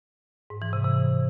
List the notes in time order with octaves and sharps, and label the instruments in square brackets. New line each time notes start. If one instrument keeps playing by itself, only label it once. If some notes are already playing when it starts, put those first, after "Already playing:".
[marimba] G#2
E3
C3
C3